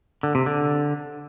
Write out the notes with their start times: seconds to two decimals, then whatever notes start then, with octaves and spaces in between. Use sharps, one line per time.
0.23 D3
0.35 C3
0.46 D3